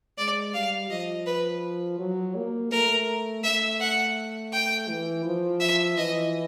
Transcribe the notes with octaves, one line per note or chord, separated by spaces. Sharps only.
G#3 D5
G3 F5
F3 D#5
B4
F#3
A#3
A3 A#4
A3 E5
F#5
G5
E3
F3
E5
E3 D#5